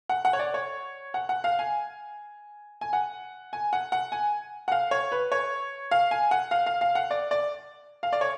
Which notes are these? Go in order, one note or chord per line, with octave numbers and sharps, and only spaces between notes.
F#5
F#5
C#5
D5
C#5
F#5
F#5
F5
G#5
G#5
F#5
G#5
F#5
F#5
G#5
F#5
F5
C#5
B4
C#5
F5
G#5
F#5
F5
F5
F5
F#5
D5
D5
F5
D5
C#5